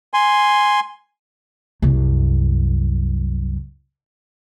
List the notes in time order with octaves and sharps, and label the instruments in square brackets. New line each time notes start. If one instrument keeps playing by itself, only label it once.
[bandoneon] G#5 C6
[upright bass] C2 F#2